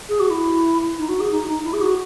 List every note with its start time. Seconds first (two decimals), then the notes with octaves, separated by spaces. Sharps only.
0.09 G#4
0.19 F#4
0.30 E4
0.98 D#4
1.09 F#4
1.20 G#4
1.31 D#4
1.47 D#4
1.64 E4
1.73 G#4
1.81 F#4